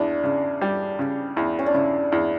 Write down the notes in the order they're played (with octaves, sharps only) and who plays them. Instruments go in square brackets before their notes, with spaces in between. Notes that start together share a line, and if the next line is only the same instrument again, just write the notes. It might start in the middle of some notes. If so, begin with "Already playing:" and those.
Already playing: [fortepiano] E2 [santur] D4
[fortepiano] C#3
G3
C#3
E2
[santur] C#4
D4
[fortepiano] C#3 [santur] E4
[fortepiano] E2